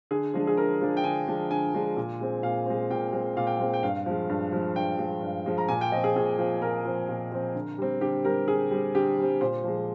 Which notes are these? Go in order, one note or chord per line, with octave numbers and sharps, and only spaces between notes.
D3 G#4
F3 G#3 D4
G#4
D3 A#4
F3 G#3 D4
G5
D3 G#5
F3 G#3 D4
D3 G#5
F3 G#3 D4
A#2
G#3 C4
A#2 F5
G#3 C4
A#2 G5
G#3 C4
A#2 F5
G5
G#3 C4 F5
G5
G2 F5
F3 G#3
G2
F3 G#3
G2 G5
F3 G#3
G2
F3 G#3
A#5
A#2 G#5
G5
F3 C4 D#5
G#4
A#2 G#4
F3 C4
A#2 A#4
F3 C4
A#2
F3 C4
D3
G3 C4
D3 G4
G3 C4 A#4
D3 G#4
G3 C4
D3 G4
G3 C4
A#2 C5
F3 G#3